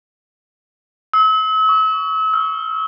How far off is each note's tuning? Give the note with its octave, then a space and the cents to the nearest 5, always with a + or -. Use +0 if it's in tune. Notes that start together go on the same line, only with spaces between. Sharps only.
E6 -40
C#6 +25
E6 +35